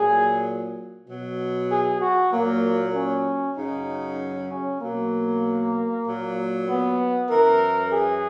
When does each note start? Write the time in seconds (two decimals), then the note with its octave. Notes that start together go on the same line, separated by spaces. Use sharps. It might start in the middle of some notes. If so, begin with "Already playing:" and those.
Already playing: A#2 F#3 G#4
1.08 B2 F#3
1.70 G#4
2.01 F#4
2.32 A#2 F#3 A#3
2.94 C#4
3.57 F#2 C#3 F#3 D#4
4.50 C#4
4.81 B2 F#3 A#3
6.05 A#2 F#3
6.67 B3
7.30 F#2 E3 A#4
7.92 G#4